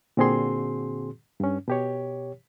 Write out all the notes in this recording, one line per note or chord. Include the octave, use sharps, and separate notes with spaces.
A#2 D3 C4 F#4 G#4 C6
G2 C#4
B2 G4 C#5